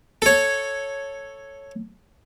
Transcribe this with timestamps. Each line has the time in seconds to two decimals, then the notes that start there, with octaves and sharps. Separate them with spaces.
0.22 A4 C#5